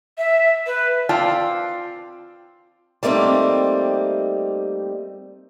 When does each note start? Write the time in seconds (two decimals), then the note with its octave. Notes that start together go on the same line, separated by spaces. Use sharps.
0.18 E5
0.66 B4
1.09 C4 F4 D5 A5
3.03 G3 A3 A#3 C4 D#4